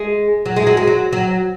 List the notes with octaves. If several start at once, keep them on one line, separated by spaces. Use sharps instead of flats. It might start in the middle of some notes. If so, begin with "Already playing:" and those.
Already playing: G#3
F#3
G#3
F#3
G#3
F#3
F#3